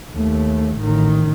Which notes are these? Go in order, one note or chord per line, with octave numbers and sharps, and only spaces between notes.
D#2 A3
A1 D#3